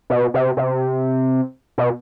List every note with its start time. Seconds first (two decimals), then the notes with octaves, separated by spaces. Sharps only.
0.10 B2
0.34 C3
0.57 C3
1.78 B2